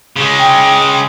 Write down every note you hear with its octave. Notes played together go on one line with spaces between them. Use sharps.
C#3 G#3
G5